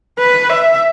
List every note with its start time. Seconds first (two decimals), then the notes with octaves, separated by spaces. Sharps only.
0.19 B4
0.50 E5